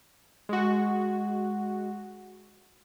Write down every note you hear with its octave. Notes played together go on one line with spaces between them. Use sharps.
G#3 F#4